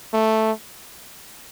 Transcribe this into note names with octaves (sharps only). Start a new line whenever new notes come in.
A3